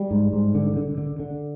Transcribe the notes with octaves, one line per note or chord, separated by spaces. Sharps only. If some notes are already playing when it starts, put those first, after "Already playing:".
Already playing: G3
G#2
G#2
D3
D3
D3
D3